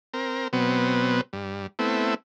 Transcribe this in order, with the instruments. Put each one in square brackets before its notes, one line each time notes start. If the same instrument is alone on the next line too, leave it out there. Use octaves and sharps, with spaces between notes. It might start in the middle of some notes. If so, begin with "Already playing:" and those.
[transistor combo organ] C4 A#4
B2 F#3 B3 C4
G2
A3 B3 C4 E4